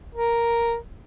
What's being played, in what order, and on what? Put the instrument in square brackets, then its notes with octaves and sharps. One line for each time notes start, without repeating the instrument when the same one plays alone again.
[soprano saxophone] A#4